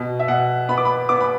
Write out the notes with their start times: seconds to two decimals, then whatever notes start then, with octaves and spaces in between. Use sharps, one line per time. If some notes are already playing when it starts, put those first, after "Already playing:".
Already playing: B2
0.20 E5
0.28 B2 F#5
0.68 B3 B5
0.78 D6
0.85 B5
1.09 B3 D6
1.21 B5